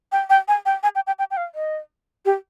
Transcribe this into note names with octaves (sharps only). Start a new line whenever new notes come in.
G5
G5
G#5
G5
G#5
G5
G5
G5
G5
F5
D#5
G4